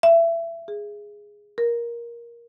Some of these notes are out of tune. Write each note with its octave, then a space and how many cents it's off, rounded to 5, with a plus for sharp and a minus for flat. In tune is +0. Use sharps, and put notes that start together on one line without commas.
E5 +25
G#4 -5
A#4 +15